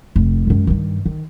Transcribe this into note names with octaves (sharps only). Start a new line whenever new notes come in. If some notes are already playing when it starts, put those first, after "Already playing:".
F1
F#2 G#3
G2 D#3
D#3